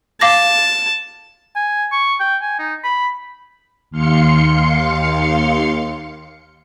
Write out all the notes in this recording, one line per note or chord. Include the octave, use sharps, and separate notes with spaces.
F5 A5 D6 A#6
G#5
C#6
G5
G#5
D#4
B5
D#2 F5 C6 C#7